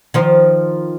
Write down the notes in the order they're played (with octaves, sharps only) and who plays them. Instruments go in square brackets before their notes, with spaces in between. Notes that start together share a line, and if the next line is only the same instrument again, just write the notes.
[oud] D#3 F3 C5